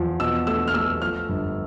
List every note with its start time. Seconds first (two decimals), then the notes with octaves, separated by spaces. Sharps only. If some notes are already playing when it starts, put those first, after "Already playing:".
Already playing: E2 F3
0.20 B2 E6
0.47 A3 E6
0.68 F6
0.74 A3 E6
1.01 F3 F6
1.29 G1